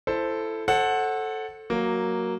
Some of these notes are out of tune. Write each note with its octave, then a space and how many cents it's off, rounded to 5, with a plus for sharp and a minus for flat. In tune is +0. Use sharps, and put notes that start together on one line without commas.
E4 +20 A4 +0 C5 +0
A4 -5 C5 +35 F#5 +0
F#3 +0 A#3 +0